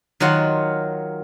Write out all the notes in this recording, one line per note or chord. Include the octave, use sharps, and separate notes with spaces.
D#3 F#3 F4 F#5 C6